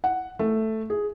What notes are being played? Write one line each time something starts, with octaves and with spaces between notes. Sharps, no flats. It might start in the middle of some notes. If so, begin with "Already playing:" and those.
F#5
A3
G#4